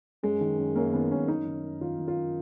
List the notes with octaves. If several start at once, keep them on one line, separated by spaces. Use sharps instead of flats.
F#2 G#3
D#3
F#2
F#2 A#3
D#3 B3
F#2 C#4
F#2 D#4
D#3
F#2
D#3 F4
D#3
F4
F#2